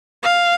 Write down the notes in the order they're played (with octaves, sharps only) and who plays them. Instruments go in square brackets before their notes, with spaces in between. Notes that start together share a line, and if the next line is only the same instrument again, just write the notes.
[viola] F5